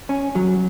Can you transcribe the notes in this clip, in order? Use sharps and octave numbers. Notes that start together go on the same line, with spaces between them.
C#4
F#3